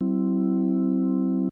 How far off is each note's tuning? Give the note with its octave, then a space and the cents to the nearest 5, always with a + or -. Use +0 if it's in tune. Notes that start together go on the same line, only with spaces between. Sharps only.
F#3 +45 C4 +0 E4 +0